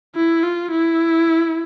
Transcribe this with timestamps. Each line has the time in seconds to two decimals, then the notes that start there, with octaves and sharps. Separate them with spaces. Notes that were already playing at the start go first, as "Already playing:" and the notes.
0.16 E4
0.43 F4
0.71 E4